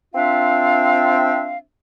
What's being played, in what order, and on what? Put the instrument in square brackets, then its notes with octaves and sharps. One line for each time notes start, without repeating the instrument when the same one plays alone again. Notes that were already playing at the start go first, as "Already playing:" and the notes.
[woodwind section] C4 D4 F4 E5 F5